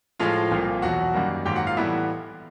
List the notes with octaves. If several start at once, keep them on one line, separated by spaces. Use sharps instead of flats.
A2 F3 G#3 F4 F5
C2 A#2 F3 A#3
E2 B2 F#3 F#4 F#5
F#2 D#3 G3 A#3
G#2 D#3 F#3 A#3 G4 G5
F#4 F#5
F4 F5
A2 E3 G3 B3 E4 E5